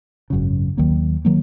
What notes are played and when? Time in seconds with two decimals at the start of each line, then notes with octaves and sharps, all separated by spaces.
0.30 G#1 F#2 C#3
0.77 D#2 D#3 F#3 A#3
1.25 D#3 F#3 A#3